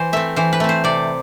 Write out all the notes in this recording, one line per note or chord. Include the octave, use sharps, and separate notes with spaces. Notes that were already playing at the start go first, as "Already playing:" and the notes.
Already playing: E3 C5
A3 C4 E5
E3 C5
B4
A3 C4
C5
C3 D5